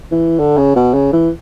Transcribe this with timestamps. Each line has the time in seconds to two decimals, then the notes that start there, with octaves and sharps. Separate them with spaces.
0.11 E3
0.39 D3
0.58 C#3
0.76 B2
0.94 C#3
1.13 E3